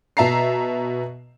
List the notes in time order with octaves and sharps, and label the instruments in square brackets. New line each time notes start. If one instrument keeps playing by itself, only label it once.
[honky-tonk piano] B2 E5 A5 A#5 C7